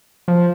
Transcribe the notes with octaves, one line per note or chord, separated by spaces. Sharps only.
F3